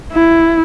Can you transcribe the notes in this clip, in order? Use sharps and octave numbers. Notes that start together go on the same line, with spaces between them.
E4